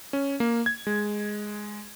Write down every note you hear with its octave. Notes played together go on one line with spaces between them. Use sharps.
C#4
A#3
G#6
G#3